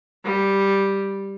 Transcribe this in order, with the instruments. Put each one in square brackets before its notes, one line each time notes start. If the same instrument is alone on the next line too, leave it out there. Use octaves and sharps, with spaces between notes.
[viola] G3